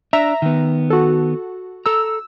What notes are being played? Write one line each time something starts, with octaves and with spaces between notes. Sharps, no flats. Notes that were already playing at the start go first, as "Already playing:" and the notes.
D4 E5 A#5
D#3 B3
F#4 A4
A4 A#5 E6